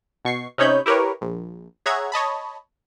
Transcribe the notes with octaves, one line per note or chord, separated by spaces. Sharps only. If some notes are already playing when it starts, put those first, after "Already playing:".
B2 C#6 C7
C3 C#4 D#4 C#5 B5 G6
E4 G4 A#4 B4 C#5
A#1
G#4 C#5 E5 F#5 A#5 G#6
C#5 D#5 A5 B5